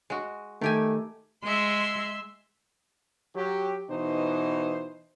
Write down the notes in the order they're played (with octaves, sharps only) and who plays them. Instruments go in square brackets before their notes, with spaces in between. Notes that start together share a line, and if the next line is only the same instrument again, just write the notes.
[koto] G#3 F#4
[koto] D#3 G4 G#5 [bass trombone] A3
[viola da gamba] G#3 [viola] E5 C6
[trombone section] F#3 G4
B2 E3 D#4 C5